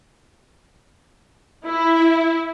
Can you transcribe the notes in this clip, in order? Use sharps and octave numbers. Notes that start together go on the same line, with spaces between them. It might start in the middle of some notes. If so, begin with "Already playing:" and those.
E4